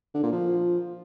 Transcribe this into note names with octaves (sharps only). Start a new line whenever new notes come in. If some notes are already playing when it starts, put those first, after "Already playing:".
D3
A#2
F3